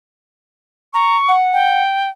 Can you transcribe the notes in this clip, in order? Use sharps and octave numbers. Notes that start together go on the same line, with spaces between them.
A#5 C#6
F#5
G5